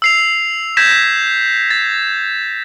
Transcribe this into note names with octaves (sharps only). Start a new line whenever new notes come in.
E6 C7 F7
G6 G#6 A#6 B6 E7
A6